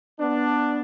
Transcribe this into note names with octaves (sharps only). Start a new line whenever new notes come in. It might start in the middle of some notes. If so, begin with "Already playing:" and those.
B3 D4